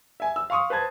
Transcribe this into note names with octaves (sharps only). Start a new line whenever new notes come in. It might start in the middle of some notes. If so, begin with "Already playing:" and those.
E5 G#5
E6
F5 C6 C#6 D#6
B4 C5 A5 G#6